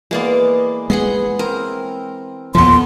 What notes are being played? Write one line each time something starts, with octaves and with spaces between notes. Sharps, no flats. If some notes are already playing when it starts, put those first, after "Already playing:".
E3 G#3 A#3 B3 D5
G#3 B3 G#4 F#5 C6
C4 A#4
D#2 A#2 F3 A3 B3 C6